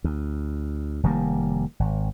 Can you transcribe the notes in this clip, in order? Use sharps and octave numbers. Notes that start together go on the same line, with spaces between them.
D2
F1 D#3 G3 A#3
G#1